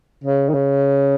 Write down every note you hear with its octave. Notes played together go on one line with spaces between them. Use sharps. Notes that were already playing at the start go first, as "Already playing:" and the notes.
C#3
D#3
C#3